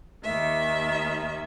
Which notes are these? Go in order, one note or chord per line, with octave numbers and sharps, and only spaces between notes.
D#2 D#3 E5